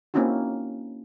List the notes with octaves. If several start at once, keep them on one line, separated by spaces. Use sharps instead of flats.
A#3 C4 C#4 D#4 E4 F#4